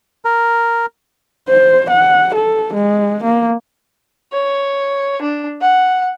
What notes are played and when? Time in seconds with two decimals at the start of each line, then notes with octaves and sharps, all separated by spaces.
0.25 A#4
1.48 C5
1.90 F#5
2.35 A4
2.74 G#3
3.24 A#3
4.32 C#5
5.22 D4
5.61 F#5